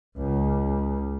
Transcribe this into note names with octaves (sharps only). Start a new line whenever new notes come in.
C#2